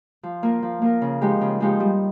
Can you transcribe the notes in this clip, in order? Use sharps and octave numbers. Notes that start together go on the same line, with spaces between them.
F3
A#3 F4 A#4
F3
A#3 F4 A#4
C#3
F3 G#3 D#4 G4
C#3
F3 G#3 D#4 G4
G3